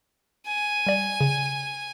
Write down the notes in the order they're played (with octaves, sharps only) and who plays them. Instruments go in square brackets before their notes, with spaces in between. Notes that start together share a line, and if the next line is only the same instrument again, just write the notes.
[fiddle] G#5
[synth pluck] G3 D5
C#3